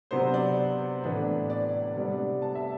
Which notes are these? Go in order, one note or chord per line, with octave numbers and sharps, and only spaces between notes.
C3 F#3 B3 D4 C5
D5
A2 E3 B3 D4
D5
C3 G3 B3 D4
A5
E5